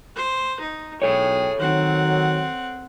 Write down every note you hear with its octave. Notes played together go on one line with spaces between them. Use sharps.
C5
D#4
B1 G#4 A4 C#5 G5
D#3 F#3 C4 F#5